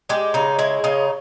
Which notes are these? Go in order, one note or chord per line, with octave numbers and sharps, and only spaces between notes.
G#3 G4
C#3 D#4
G#3 E4
C#3 D#4